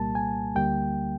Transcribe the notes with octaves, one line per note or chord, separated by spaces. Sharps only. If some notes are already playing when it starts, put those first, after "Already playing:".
Already playing: C2 A#2 G3 A#3 A5
G#5
D2 D3 G3 A#3 G5